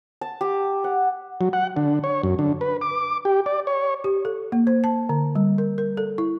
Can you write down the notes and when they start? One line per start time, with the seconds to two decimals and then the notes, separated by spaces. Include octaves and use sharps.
0.21 A5
0.41 G4
0.84 F#5
1.41 F#3
1.53 F#5
1.76 D3
2.04 C#5
2.23 F#2
2.39 D3
2.61 B4
2.81 D6
3.25 G4
3.46 D5
3.67 C#5
4.04 G4
4.25 A4
4.52 A#3
4.67 C5
4.84 A5
5.09 D3
5.35 G3
5.58 A#4
5.78 A#4
5.97 A4
6.18 E4